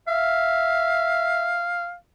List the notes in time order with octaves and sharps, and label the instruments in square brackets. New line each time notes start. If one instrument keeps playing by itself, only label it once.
[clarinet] E5 [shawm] F5